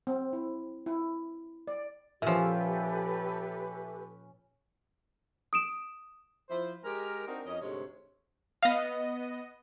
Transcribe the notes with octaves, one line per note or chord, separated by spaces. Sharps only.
C4
E4
E4
D5
A#2 F3 C#4 G4 A4 B4 E5 G#5
D#6 D7 E7
F3 E4 C5
G#3 G4 A#4
C4 D4 D#4 F#4 A#4
F2 C#4 D#5
D2 G#2 C3 C#5
B3 D#5 F5 A#6